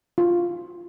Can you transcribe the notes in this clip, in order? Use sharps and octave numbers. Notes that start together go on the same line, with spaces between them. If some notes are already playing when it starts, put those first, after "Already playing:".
F4